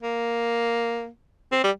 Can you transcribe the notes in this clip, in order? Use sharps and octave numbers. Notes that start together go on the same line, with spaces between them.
A#3
C4
G3